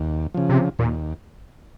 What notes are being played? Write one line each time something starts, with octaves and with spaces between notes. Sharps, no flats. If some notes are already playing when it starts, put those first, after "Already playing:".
Already playing: D#2
C#3 F3
C3
D#2 A#2